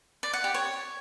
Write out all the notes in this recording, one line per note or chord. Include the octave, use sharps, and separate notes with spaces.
D5
F#5
G4
C#5